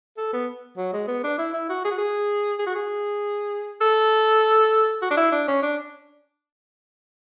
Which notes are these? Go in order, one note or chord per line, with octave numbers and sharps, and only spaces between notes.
A4
B3
F#3
G#3
B3
D4
E4
E4
F#4
G#4
F#4
G#4
G#4
F#4
G#4
A4
F#4
D4
E4
D4
C#4
D4